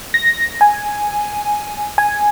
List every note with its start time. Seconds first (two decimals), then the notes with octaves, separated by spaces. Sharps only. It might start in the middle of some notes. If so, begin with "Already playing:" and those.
0.14 A#6
0.61 G#5
1.98 G#5